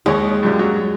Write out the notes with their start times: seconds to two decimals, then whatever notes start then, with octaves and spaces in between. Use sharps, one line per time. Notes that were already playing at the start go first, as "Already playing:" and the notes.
0.06 D#2 G#3 C#5
0.43 F#2 A#2 G3
0.59 F#3